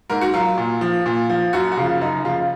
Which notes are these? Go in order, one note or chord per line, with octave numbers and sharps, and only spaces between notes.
G#2 A#4
F#4
F#3 F4
A#2
F3
A#2
F3
F#2 F#4
F#4
C#3 F3 F4
F#2 D#4
C#3 F3 F4